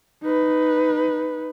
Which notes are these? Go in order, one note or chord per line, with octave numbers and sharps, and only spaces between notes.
D#4 B4